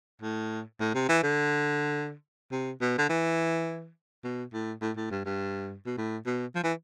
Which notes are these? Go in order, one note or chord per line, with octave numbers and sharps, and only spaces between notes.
A2
A2
C3
E3
D3
C3
B2
D3
E3
B2
A2
A2
A2
G2
G2
B2
A2
B2
F3
E3